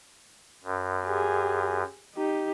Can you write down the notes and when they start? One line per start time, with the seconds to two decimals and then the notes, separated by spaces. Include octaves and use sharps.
0.64 F#2
1.06 G4 G#4
2.16 D#4 G4